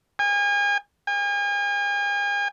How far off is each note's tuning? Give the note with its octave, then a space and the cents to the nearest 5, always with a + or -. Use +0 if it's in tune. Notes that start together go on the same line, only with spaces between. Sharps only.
G#5 -35
G#5 -40